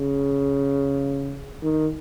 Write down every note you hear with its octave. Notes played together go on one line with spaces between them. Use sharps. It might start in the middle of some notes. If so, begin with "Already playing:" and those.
Already playing: C#3
D#3